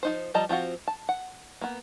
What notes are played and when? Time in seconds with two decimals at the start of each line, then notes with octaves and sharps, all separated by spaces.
0.03 F3 D#4 C5
0.34 F3 G3 D#5 A5 A#5
0.49 F3 C4 F4 F#4
0.87 A5
1.09 F#5
1.61 A#3 B3